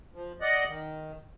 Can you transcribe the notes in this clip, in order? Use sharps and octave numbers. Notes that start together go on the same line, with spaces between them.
F3
D5 D#5 F#5
D#3